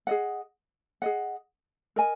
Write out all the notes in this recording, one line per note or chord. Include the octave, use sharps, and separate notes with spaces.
G#4 D#5 F#5
G#4 D#5 F#5
A#4 D#5 G#5